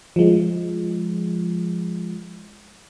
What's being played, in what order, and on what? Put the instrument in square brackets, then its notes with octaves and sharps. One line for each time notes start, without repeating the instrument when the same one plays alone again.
[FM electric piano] F3 G#3